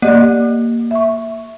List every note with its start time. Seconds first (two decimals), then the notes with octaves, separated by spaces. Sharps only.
0.02 A#3 G4 D5 D#5
0.91 E5 C#6